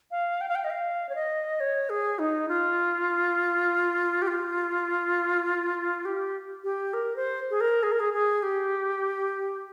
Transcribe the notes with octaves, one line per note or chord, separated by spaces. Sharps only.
F5
G5
F5
G5
D#5
F5
C#5
D#5
C#5
G#4
D#4
F4
G4
F4
G4
G4
A#4
C5
G#4
A#4
G#4
A#4
G#4
G#4
G4